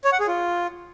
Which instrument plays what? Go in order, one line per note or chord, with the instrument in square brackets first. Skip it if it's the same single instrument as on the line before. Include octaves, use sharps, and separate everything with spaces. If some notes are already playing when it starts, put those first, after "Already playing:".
[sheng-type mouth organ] C#5
F#5
G#4
F4